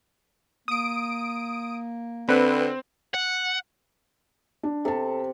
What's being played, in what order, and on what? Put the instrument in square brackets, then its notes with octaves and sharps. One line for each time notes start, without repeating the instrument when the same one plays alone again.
[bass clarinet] A#3 [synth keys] D#6 D7
[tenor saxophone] D3 [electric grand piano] C4 [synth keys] B4
[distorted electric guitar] F#5
[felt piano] D4
[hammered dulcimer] C3 [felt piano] A4 A5